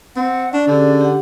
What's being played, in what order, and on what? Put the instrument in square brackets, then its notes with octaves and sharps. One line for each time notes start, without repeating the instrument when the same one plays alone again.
[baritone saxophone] C4 [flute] F#5
[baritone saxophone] D4 [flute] D5 [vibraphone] C#6
[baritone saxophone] D3 [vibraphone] C#4 G4 G#4
[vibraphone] G4 F#5